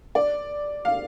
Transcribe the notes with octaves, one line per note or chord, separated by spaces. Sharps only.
D5
F5